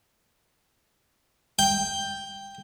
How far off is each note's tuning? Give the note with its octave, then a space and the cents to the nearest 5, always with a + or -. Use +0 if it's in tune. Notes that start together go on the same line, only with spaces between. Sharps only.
G5 +5